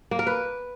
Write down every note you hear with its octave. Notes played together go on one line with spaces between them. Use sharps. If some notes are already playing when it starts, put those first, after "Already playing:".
A#3
A#4
B4